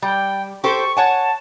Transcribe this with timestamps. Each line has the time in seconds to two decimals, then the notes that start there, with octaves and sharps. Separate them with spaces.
0.02 G3 G5
0.64 G4 A4 C5 C#6
0.97 C#5 F#5 G#5 A5